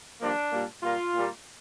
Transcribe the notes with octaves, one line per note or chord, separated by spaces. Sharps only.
G2 F3 A#3 D4
A#2 G3 A#3
A#2 G3 A#3 F4
A#2 G3 A#3